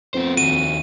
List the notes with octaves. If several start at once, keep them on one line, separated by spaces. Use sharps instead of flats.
F2 B3 C5
D#2 F#4 D#7